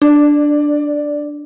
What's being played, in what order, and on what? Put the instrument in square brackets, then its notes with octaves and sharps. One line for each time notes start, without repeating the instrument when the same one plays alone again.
[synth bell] D4 [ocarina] D5